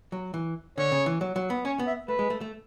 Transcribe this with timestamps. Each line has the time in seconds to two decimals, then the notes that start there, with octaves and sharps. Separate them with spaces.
0.12 F#3
0.34 E3
0.78 D3 C#5
0.92 C#3
1.06 E3
1.21 F#3
1.36 F#3
1.50 B3
1.65 C#4 C#5
1.79 B3
1.87 E5
2.08 A3 B4
2.19 G#3
2.30 A3
2.41 A3